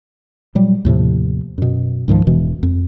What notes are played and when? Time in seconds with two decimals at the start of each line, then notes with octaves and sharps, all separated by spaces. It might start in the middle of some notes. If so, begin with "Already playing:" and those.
0.55 A#2 F#3 G3
0.85 D#2 A2 C3 F3
1.58 F#2 B2
2.08 C#2 G#2 D#3 F3
2.27 E1 B2 E3
2.63 F2